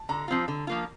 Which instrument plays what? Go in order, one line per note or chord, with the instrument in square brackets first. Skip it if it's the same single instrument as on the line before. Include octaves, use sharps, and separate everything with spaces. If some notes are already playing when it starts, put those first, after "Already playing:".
Already playing: [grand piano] A5
[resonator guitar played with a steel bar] D3 [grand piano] A#5
[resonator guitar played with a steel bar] F3 C4 F4
D3
F3 A#3 F4